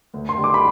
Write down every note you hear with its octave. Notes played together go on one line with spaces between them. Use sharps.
D2
C6
D3 G3
D6
B5